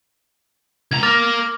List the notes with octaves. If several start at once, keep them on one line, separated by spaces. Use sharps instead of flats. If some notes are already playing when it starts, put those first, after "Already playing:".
C#2 A#5 G#6
A#3 A#4 D6 F6 A6